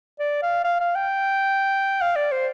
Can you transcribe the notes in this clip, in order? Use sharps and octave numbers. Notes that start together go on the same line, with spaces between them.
D5
F5
F5
F5
G5
F5
D5
C5